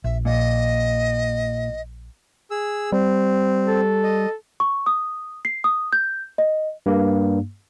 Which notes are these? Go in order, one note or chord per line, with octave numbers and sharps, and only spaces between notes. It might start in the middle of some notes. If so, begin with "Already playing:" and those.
A#1 E5
A#2 D#5
G#4 E6
G3 C4
A4
D#5
C#6
D#6
C7
D#6
G6
D#5
G2 A#3